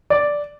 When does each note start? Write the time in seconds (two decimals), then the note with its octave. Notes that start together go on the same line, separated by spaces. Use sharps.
0.10 D5